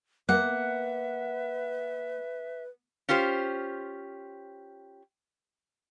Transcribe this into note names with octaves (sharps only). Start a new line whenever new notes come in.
A#3 B4 E5 F#5
C#4 F4 G4 C5